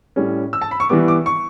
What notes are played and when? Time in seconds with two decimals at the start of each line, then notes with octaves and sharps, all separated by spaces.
0.16 A2 G3 C#4
0.53 E6
0.61 A5
0.71 B5
0.80 C#6
0.89 E3 G3 B3 D6
1.08 D6
1.26 C#6